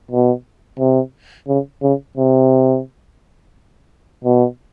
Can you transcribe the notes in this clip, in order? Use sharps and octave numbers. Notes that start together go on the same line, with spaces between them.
B2
C3
C#3
C#3
C3
B2